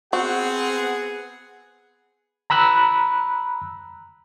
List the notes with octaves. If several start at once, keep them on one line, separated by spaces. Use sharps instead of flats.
B3 C4 F#4 G#4 F#5
A#5 B5 E6 F#6